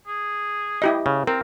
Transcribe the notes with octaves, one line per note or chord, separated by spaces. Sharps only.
G#4
E4 G4 D#5
C#3
C4 A#4